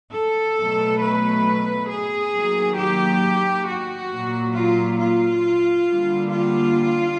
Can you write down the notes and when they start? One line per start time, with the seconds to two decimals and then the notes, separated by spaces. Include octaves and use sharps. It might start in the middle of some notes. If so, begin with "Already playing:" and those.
0.13 A4
0.58 B2 F#3 A3
1.01 B4
1.90 G#4
2.34 D#3 F#3 A#3
2.79 G4
3.67 F#4
4.12 A#2 F#3 A#3
4.55 F4
5.00 F4
5.88 D3 G3 A#3
6.32 F4